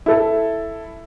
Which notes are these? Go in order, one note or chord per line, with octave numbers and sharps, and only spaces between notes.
E4 A4